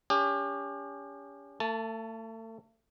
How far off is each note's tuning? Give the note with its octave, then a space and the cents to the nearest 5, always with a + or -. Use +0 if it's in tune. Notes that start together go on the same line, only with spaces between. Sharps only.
C#4 +35 G4 +35
A3 +35 A5 +0